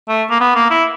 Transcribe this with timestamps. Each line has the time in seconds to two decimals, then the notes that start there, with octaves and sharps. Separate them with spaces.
0.09 A3
0.30 A#3
0.40 B3
0.55 A#3
0.70 E4